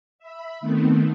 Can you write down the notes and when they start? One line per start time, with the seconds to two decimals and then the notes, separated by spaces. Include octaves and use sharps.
0.19 E5 B5
0.61 D#3 A3 B3 C4